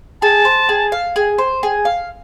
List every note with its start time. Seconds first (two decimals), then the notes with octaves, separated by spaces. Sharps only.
0.21 G#4 A5
0.45 C5
0.69 G#4
0.92 F5
1.16 G#4
1.38 C5
1.63 G#4
1.85 F5